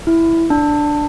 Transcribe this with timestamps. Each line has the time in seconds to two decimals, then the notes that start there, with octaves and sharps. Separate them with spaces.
0.07 E4
0.50 D4